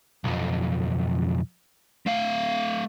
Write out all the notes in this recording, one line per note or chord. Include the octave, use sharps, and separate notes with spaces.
B1 F2
A3 F5